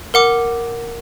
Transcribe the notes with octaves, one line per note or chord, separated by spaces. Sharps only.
A#4 F#5 D6